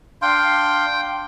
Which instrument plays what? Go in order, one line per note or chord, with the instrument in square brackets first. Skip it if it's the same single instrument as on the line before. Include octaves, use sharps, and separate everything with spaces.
[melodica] D4 F5 C6 [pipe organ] G5